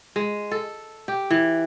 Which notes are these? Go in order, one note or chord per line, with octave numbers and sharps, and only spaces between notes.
G#3
A4
G4
E3